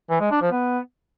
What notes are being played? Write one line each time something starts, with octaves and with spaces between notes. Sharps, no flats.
E3
G#3
D4
F3
B3